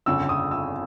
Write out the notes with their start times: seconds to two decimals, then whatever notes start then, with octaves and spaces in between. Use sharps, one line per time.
0.06 G1 F2 C#3 E6
0.29 D#6
0.51 E6